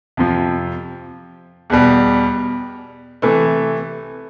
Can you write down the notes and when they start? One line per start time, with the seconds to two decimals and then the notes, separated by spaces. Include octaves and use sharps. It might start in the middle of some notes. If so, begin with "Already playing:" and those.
0.17 F2 C3 F3
1.70 E2 B2 G3
3.22 C3 E3 A3